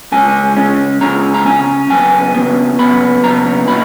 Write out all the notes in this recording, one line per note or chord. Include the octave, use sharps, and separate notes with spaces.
C#3 G#3 C#4 G#5
C#3 G#3 C#4
C#3 G#3 C#4 A#5
A#5
C#3 G#3 C#4 G#5
C#3 F#3 B3 G#5
C#3 F#3 B3
C#3 F#3 B3 B5
C#3 F#3 B3 A#5
A#2 F#3 B3 D#4 B5